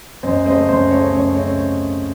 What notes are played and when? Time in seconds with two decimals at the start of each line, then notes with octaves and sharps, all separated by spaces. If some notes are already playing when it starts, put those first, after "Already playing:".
0.23 F#2 C5 D#5
0.45 C#3 A3 C4 C5 D#5
0.68 F#2 C5
0.90 C#3 A3 C4 C#5
1.12 F#2 C#5
1.35 C#3 A3 C4 C#5